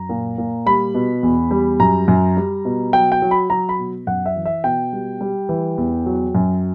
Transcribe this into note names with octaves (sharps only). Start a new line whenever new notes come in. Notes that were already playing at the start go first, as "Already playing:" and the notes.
Already playing: F#2 A#5
A#2
A#2
G3 B5
B2
E2
G3
F#2 A#5
F#2
G3
B2
F#3 G5
G5
F#3
B5
F#3 A#5
B5
B2
F#2 F#5
E5
E3
E5
B2 G5
G3
G3
E3
E2
F#3
F#2